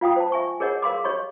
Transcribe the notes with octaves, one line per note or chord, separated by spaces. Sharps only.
F4 F5 G5 D#6
C5 A5
E5 G#5 C#6
G#4 A#4 C#5 D#5 F#5
A#4 F5 C6 D6
G4 C#5 D#5 C6 C#6